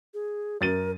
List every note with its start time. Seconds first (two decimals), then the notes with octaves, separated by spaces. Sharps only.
0.14 G#4
0.61 F#2 A#4 A6 D#7